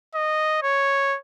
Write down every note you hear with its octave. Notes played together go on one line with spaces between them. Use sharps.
D#5
C#5